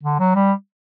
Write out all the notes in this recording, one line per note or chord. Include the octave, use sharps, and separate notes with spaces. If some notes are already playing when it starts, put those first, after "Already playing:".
D3
F#3
G3